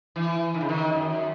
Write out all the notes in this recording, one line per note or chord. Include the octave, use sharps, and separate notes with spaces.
E3
D#3
C#3
D#3
F#2